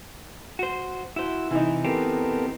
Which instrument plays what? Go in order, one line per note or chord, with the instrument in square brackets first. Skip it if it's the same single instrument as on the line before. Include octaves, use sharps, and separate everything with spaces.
[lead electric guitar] F#4 C5
[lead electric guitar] E4 C5 [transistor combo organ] F#4 E6
[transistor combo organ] C3 [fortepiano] E3 D#4
[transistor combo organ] B3 A4 A#4 [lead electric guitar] C4 G4